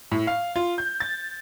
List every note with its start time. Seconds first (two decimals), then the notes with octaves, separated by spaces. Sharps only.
0.12 A2
0.27 F5
0.56 F4
0.78 G6
1.00 A6